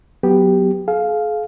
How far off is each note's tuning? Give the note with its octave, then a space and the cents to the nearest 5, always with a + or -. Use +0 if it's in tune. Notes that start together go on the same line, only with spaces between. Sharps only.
F#3 +0 B3 +0 G4 +0
G#4 +45 F5 +0